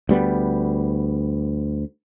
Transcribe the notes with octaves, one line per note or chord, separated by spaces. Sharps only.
D2 G3 B3